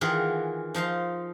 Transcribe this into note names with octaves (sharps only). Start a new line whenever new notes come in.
D#3 E3 F4 G#4 A#4 F#5
F3 D#4 F5 C6